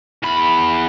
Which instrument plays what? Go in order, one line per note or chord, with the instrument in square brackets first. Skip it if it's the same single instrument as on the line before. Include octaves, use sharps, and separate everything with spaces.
[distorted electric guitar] E2 B5